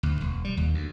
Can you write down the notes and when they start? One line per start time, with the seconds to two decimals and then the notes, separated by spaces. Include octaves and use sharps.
0.03 D2
0.21 E1
0.45 G3
0.57 D#2
0.74 D2